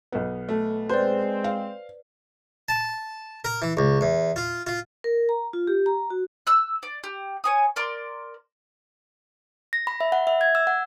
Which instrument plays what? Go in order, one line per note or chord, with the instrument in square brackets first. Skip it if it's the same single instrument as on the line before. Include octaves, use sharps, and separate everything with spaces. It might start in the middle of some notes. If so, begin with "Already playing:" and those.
[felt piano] B1 B3
[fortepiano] A3
[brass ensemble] G#3 C4 [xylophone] B4 D5 [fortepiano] C5
[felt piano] F5
[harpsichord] A5
A#4
E3
C#2
E2
F4
F4
[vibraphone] A#4
A#5
F4
G4
A#5
F#4
[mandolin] E6 F#6
D5
G4
C#5 G#5 D#6
A#4 D5 C6
[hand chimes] A#6
B5
E5
F#5
E5
G#6
E6
F#5